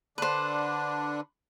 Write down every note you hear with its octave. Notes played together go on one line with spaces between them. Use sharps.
D3 D4 B4 C5